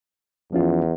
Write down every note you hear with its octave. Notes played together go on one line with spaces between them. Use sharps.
E2 F3 C#4 F4